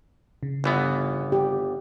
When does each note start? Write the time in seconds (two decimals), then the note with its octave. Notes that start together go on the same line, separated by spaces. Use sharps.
0.43 C#3
0.64 G1 E3 B3
1.32 G4